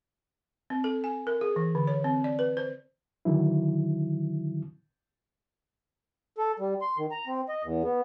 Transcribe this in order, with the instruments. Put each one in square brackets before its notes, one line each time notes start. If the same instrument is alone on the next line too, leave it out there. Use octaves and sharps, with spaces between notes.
[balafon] C4
A4
G#5
A#4
G#4
E3
D3
C#5
C4
D5
B4
C5
[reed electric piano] D3 D#3 F#3 E4
[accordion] A4
G3
C6
D#3
A#5
C4
D#5
E2
B3